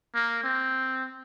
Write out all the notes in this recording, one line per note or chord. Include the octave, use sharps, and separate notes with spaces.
A#3
C4